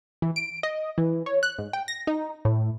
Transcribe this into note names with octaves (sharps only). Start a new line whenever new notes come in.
E3
D7
D#5
E3
C#5
F#6
G#2
G5
A#6
D#4
A2